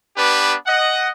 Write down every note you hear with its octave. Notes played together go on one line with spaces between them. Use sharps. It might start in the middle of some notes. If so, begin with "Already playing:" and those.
B3 D4 G4 B4
D#5 F#5